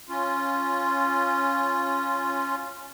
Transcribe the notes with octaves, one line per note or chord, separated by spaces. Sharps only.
C#4 F4